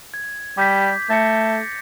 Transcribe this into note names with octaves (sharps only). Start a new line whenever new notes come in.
G#6
G3 D6 G6 B6
A3 A6 A#6 C#7